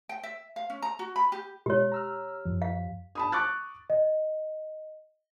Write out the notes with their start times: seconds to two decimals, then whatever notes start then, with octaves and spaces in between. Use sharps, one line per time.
0.09 G5
0.23 E5
0.56 F5
0.70 C#4
0.82 A#5
0.99 F#4
1.16 B5
1.32 G4
1.66 B2 G#3 G4 C#5
1.92 A#5 E6 F6
2.45 F#2 F3
2.62 F5
3.15 A5 B5 D#6
3.32 C#6 D6 F#6 A6
3.90 D#5